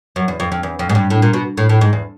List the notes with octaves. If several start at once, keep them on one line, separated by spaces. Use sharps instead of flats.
F#2
E2
F2
F2
E2
F2
G#2
G2
A2
A#2
B2
A2
A2
G#2
E2